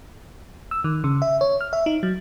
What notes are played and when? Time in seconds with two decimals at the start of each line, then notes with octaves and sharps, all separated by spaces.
0.71 E6
0.84 D#3
1.04 C#3
1.22 E5
1.41 C#5
1.61 F6
1.73 E5
1.86 D#4
2.03 F#3